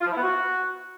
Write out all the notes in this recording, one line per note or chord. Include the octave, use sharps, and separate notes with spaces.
F4
F3
E4
B3
F#4